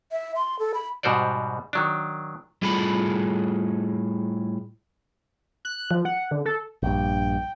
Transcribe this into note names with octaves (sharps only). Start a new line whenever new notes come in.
E5
C6
A4
B5
G#2 B2 G3 F#4 C5 D5
D#3 F#3 D4
A2 G3 F4 G#4 A4 B5
F#6
F3
F#5
D3
A4
A#1 G2 G5